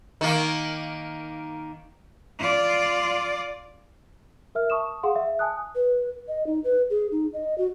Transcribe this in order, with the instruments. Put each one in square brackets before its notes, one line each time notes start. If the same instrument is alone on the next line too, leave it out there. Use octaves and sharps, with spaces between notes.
[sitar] D#3 A#3
[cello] F4 D5
[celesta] A#4 E5 F6
A5 C#6 D#6 E7
G#4 F5 F#5 C6
E5
G#5 A5 D#6 F#6
[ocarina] B4
D#5
D#4
B4
G#4
D#4
D#5
F#4